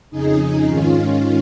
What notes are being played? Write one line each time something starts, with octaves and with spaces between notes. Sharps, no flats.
F2 C#3 D#4 G#4
G#2 D#3 C#4 F4